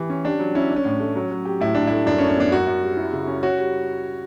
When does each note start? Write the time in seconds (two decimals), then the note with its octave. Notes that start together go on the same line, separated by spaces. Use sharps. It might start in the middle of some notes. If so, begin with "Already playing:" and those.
Already playing: E3 G4
0.10 C#4
0.24 D4 G4
0.39 F#3
0.55 C#4 E4
0.70 D4
0.76 C#4
0.85 A2
1.00 A3
1.16 F#3
1.31 F#3
1.45 G4
1.60 A2 E4
1.75 A2 D4
1.87 E4
1.91 A3
2.06 F#2 D4
2.18 C#4
2.21 F#2
2.29 C#4
2.37 B3 D4
2.51 F#2 F#4
2.67 F#2
2.82 G3
2.97 E4
3.13 C#3
3.27 C#4
3.43 F#4 C#5
3.58 G3